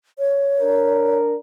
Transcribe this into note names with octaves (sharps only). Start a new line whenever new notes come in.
C#5
D4 A#4